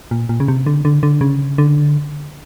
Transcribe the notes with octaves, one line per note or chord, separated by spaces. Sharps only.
A#2
A#2
C#3
C3
D3
D3
D3
C#3
D3